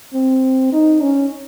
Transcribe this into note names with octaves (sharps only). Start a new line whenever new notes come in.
C4
D#4
C#4